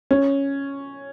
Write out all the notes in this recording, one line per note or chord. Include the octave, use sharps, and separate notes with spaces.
C#4